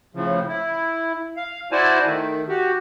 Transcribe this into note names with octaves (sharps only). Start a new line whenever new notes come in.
A2 C#3 F3
E4
F5
E4 F#4 C5 D5 G#5 A5
D#3 A3
F#4 G4